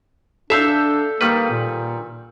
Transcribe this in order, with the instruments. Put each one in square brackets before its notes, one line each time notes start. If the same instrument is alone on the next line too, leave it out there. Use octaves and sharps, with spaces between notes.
[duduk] D4 [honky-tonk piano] A4 E6 G6 [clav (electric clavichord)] E5 F5
[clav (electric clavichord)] D#3 G3 B4 [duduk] A#3
[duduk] A#2